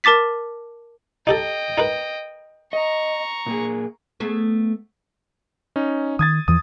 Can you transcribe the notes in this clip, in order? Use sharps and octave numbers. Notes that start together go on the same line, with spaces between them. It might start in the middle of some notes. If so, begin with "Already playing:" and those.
A#4 A5 D6 A6 B6
D#4 G4 A4 D#5 G5
D#4 A#4 B4
D#5 A#5 C#6
A#2 A#3 G#4
A3 B3 G#4
C#4 D#4
D#3 D#6 G#6 A6
E2 E3 F3 D#6